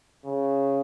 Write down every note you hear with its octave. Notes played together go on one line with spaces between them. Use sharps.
C#3